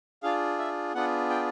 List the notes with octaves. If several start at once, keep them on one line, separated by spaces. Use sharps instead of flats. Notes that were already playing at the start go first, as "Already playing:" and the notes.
D4 F4 G#4 F5
E5
B3 D4 F4 G#4 F#5
G5